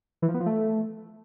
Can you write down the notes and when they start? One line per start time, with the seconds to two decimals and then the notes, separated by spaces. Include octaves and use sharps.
0.22 E3
0.28 F3
0.34 B3
0.40 F3
0.46 A3